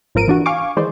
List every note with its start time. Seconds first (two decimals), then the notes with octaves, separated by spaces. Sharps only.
0.15 G#1 F3 A#4 D7 D#7
0.28 E3 D4 F#4
0.46 F5 G#5 C#6 D6
0.77 D#3 E3 G#3 C5 D5